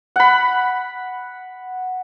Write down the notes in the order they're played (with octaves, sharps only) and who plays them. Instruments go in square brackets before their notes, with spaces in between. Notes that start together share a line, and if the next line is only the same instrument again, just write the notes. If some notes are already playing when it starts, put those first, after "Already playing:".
[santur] F#5 B5